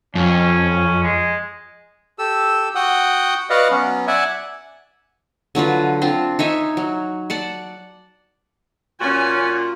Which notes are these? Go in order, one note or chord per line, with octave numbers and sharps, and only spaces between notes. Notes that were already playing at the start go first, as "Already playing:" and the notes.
F2 C#4
G#3
G4 A4 E6
F#4 F#5 G5 D#6
F#4 B4 D5 D#5 F5 F#5
F#3 B3 C#4
D5 E5 F#5 G#5
D3 F#3 F4 B4
C4 D4 F4
D#4 C#5 E5 G#5
F#3
D5 F#5 A5
A#2 C#4 F4 F#4 G#5